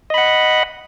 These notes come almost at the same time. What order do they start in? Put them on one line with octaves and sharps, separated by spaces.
D#5 B5 F#5